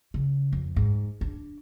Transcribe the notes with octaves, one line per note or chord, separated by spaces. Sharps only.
C#3
F2
G#2
D4